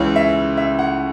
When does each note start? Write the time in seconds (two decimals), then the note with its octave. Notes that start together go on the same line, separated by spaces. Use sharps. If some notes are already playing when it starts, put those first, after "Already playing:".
Already playing: C#2 C#3 E3 C#5
0.16 E5
0.57 E5
0.79 F#5